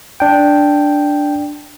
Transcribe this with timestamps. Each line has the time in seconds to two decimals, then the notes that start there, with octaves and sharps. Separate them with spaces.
0.20 D4 G5